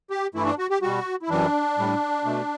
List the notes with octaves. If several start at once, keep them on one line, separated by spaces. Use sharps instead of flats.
G4
G2 E3 A3 E4
D4
F#4
G4
B2 G3 F#4
E4
F#2 E3 G3 D4
A2 G3
B2 A3